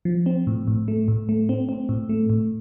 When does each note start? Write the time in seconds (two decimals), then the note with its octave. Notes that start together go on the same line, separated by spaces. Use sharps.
0.05 F3
0.26 C4
0.47 A2
0.68 A2
0.88 A3
1.08 A2
1.29 A3
1.49 C4
1.69 C4
1.89 A2
2.09 A3
2.30 A2